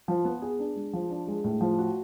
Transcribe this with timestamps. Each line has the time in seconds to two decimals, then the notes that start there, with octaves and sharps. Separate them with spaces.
0.08 F3
0.25 B3
0.42 G#4
0.59 D4
0.75 G#3
0.93 F3
1.10 D4
1.27 G#3
1.44 A2
1.61 F3
1.79 F#4